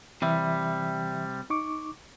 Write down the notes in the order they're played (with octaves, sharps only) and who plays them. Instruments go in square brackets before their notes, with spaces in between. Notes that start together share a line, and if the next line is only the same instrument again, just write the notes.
[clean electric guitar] C3 G3 [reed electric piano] E3 E5
[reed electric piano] D#4 C#6 D6